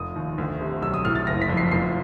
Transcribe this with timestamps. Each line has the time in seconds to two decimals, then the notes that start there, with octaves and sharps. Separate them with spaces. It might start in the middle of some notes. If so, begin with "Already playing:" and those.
Already playing: F1 D#6
0.16 D#2
0.38 D2
0.61 C3
0.82 B1 E6
0.94 D#6
1.05 A2 F6
1.15 A6
1.27 F#1 A#6
1.42 B6
1.49 F2
1.57 C7
1.71 F1 C7